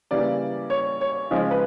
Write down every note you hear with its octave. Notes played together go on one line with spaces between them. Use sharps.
C#3 E3 G3 A#3 D5
C#5
C#5
C#3 F3 G#3
B4